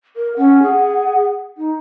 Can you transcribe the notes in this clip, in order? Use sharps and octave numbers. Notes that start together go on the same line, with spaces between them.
A#4
C#4 F#5
G#4
D#4